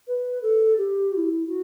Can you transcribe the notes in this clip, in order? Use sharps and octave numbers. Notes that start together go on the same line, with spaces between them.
B4
A4
G4
F#4
E4
F#4